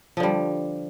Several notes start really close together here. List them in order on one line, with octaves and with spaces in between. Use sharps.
F3 D3 G3